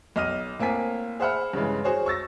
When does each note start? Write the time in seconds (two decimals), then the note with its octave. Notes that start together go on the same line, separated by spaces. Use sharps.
0.16 B1 D#5 F6 D#7
0.59 A2 A#3 C4 G#5 B6
1.20 G#4 C5 E5 F#5 B5 F6
1.53 G2 C#3 E3 G#3
1.84 F#4 G#4 C5 C#5
2.06 C#6 E6 A6 A#6